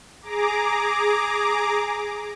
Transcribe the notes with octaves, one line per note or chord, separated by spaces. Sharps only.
G#4 A#5 D6